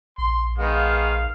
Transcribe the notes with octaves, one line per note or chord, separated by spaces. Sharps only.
A#1 C6
D#3 G#3 B3 F5